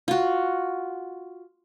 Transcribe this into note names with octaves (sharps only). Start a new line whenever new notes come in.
F4 F#4